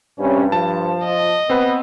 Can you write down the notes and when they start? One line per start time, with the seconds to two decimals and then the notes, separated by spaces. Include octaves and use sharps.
0.19 G2 C3 G3 C#4
0.52 F3 A5
1.04 D#5
1.50 B3 C4 B4